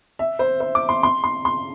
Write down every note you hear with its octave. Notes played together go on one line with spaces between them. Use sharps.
E5
C5
C5
D6
C6
C6
C6
C6